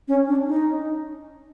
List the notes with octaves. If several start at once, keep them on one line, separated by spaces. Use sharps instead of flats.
C#4
D4
D#4